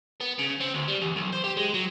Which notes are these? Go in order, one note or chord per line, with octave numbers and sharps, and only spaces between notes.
B3
C#3
C4
D2
G3
E2
B1
C5
G4
G#3
F#3